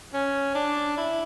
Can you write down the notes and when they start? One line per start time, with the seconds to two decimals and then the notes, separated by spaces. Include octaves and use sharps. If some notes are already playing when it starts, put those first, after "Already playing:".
0.14 C#4
0.55 D4
0.97 E4